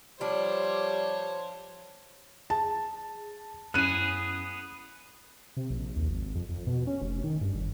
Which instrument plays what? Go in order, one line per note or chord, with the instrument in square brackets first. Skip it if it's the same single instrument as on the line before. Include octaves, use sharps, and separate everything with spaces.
[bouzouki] F3 D4 [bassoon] G3 [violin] C5 C#5
[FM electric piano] G#4 [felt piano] A5
[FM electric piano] F#2 C#4 E4 [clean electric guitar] B3 G#4 [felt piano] F#6 D#7
[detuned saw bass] C3
A#1
D#2
G#1
F2
F2
B2
C#4
F1
D#3
G2
G1